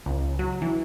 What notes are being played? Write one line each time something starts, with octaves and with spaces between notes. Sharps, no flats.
C#2
F#3
E3